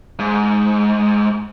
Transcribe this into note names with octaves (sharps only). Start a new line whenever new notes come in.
G#2